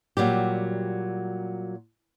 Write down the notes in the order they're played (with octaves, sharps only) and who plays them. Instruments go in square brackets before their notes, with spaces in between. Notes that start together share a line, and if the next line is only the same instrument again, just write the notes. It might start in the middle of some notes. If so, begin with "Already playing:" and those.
[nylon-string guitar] A#2 F#3 G3 G4